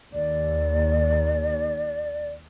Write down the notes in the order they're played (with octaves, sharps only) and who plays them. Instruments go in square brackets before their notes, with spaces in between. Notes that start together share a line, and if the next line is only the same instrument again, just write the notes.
[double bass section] D#2 [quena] D5